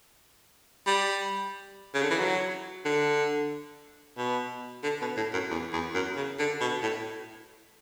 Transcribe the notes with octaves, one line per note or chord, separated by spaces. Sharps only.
G3
C#3
D3
E3
F#3
D3
B2
D3
B2
A2
F#2
E2
E2
F#2
C#3
D3
B2
A2